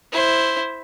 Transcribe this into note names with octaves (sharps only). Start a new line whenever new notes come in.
E4 C5